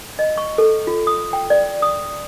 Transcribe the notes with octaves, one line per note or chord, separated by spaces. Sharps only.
D#5
C#6
A4
F4
D#6
G5
D5
D#6